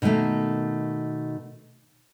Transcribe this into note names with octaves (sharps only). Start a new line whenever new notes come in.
B2 D#3 F3 A3 A#3